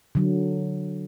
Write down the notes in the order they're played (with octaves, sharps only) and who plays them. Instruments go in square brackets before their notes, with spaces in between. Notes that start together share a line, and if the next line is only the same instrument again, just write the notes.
[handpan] D3 F#3